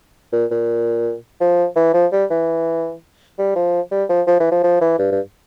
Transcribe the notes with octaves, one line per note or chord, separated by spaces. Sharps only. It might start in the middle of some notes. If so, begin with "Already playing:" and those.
A#2
A#2
F3
E3
F3
G3
E3
G3
F3
G3
F3
F3
E3
F3
F3
E3
G2
G2